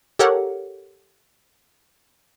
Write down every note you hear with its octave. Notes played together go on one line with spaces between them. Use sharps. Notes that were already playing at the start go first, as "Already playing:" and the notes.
G4 A4 A#4 C#5 F#5